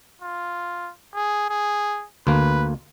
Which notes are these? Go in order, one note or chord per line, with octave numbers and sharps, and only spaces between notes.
F4
G#4
G#4
D2 A#3 B4